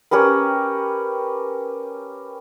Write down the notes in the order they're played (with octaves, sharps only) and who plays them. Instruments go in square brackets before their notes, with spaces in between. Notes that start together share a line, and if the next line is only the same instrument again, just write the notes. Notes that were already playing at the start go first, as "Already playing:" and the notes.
[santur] C#4 G4 A#4 B4